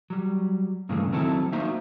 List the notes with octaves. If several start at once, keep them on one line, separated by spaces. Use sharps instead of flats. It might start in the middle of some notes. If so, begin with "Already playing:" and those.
F#3 G3
G2 A#2 C#3 E3 G#3 A3
D#3 F#3 C4 E4 A4
A#3 D#4 F#4 C5 E5